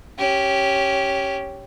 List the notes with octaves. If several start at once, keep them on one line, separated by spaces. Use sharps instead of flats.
C#4 G4